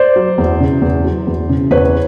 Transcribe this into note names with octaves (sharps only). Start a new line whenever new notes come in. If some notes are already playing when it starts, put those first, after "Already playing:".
Already playing: C5 D5
F#3
E2
C#3
E2
F#3
E2
C#3
E2 B4 C#5